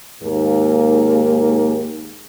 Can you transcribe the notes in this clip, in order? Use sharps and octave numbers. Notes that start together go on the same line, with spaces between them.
D#2 G#2 A#3 G#4